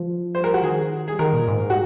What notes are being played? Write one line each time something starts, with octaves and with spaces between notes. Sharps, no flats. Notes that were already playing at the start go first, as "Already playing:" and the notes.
Already playing: F3
C5
A#4
F#4
D#3 G#4
G#4
D#3 A#4
A#2
G#2
F#4